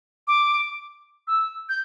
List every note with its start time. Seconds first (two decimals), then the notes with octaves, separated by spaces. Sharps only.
0.28 D6
1.27 E6
1.69 G6